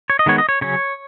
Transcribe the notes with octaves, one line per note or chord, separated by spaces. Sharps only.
C#5
D#5
D#3 G#3 B3 C#5
D#5
C#5
C#3 F#3 C#4 C#5